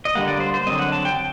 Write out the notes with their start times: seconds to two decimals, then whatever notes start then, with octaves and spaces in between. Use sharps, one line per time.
0.05 D#5
0.15 D3 G3 A#3 F#5
0.28 D5
0.40 C5
0.54 C5
0.67 D3 F#3 A3 C4 D#5
0.79 F#5
0.92 A5
1.05 G5